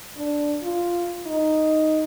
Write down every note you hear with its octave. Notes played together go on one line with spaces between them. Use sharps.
D4
F4
D#4